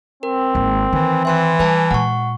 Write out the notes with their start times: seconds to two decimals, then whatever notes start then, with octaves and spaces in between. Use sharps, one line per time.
0.23 C4 A#4
0.55 G#1 A#3
0.93 D#3 E3
1.25 E3 E5 C6 F#6
1.59 G3 B4 G#5 A5
1.91 A#2 G#3 F#5 C#6